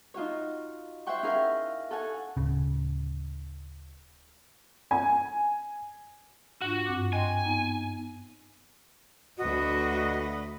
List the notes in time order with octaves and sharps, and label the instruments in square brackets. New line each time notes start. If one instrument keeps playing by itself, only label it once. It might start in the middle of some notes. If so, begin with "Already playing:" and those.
[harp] D#4 F4 F#4 C#5
C5 C#5 E5 F#5 G5 C#6
C#4 E4 G#4 A#4 F5 G5
A4 C#5 F#5 G#5
[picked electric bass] D1 C#3
[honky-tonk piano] G#5
[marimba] G#2 D4 F4 [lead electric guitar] F#4
[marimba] G2 C4 D6
[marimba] D#5 G5 C6 [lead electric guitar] G#5
[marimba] B3 D#4 A#5
[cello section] D2 B4 D#5 [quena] F#4